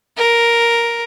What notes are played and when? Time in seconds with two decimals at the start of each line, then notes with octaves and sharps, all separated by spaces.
0.17 A#4